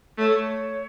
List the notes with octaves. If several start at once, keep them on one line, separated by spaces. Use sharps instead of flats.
A3 C#5